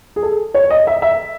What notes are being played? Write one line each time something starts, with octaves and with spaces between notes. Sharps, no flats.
G#4
A4
C#5
D#5
E5
E5